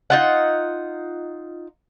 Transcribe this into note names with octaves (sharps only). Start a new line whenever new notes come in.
D#4 F4 F#5